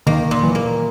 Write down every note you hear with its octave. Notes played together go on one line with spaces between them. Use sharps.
D#3 A#3
A#2
E3
A#3